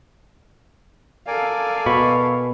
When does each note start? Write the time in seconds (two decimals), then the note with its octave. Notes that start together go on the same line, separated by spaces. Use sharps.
1.27 A4 A#4 D5 F5 G#5
1.86 B2 B5 C#6